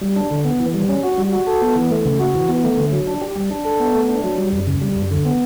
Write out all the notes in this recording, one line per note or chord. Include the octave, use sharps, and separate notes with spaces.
G3
D4
D3
B3
E3
G3
C#4
F#4
G3
F#4
A4
B3
E3
A3
C#3
F#4
E3
B3
A3
D3
F#3
D4
G4
G3
D4
A4
B3
A3
D4
F#3
G3
F#2
C#3
G3
F#2
D3
B3